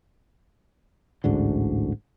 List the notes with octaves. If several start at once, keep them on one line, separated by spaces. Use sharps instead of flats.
A1 D2 G#2 D3